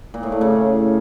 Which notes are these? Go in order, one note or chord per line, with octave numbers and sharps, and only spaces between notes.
A#2
A2
A3
C#3